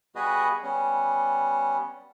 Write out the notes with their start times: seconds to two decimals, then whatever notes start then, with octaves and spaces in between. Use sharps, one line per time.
0.16 G3 B3 F#4 G#4 B4 D#5
0.63 G3 B3 C#4